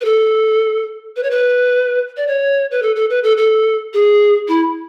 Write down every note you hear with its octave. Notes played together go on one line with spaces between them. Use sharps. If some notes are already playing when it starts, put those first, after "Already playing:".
B4
A4
B4
C#5
B4
D5
C#5
B4
A4
A4
B4
A4
A4
G#4
E4